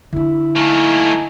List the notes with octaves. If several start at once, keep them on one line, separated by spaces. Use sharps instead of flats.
D3 D4 E4
A3 A#3 D#4 G#5 A5